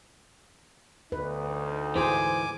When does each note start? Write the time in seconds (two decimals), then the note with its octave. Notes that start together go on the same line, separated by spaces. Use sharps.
1.12 D2 D#4 B4
1.96 G#2 E3 G#4 C5 G#5 D6